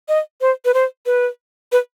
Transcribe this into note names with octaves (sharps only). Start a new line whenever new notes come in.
D#5
C5
B4
C5
B4
B4